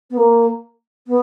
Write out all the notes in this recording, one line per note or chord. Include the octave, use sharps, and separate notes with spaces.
B3
A#3
B3